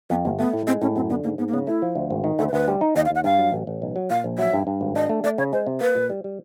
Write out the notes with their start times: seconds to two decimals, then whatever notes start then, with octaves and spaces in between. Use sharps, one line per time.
0.10 F2 B3
0.25 G1 A#3
0.39 A3 B3
0.53 A2
0.67 G#3 C4
0.82 A2 C#4
0.96 F#2 C4
1.10 D3 B3
1.24 G#2 A#3
1.38 G#2 B3
1.48 A#3
1.54 C#3 B3
1.67 A3 E4
1.82 F3
1.95 D2
2.10 G#1
2.24 D#3
2.39 D2 A4
2.49 C5
2.53 D2 B4
2.68 G3
2.81 D#4
2.96 D#2 D#5
3.06 F5
3.10 D#2 F#5
3.24 G2 F5
3.38 F#3
3.52 A1
3.67 A1
3.82 B1
3.96 F#3
4.10 A#2 F5
4.24 A#1
4.38 F#3 E5
4.53 G2
4.67 G2
4.81 G#1
4.96 D4 D#5
5.09 A3
5.24 A3 D5
5.38 C#3 C#5
5.53 G#3 C5
5.67 C3
5.81 A#3 B4
5.95 A#2
6.10 G3
6.24 G3